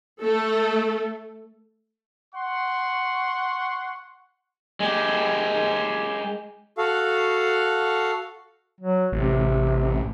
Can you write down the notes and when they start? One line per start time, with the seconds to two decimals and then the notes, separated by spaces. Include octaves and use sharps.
0.20 A3 A4
2.35 F#5 C6 C#6
4.80 G#3 G4
6.78 F#4 A4 F5
8.81 F#3
9.12 A1 C3